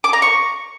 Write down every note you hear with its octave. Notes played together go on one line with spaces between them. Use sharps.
D6
A#5
C#6